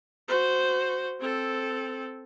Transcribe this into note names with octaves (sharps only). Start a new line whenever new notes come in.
F#4 C5
C4 A4